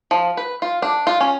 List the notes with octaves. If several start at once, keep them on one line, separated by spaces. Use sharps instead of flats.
F3
B4
F4
D4
F4
C#4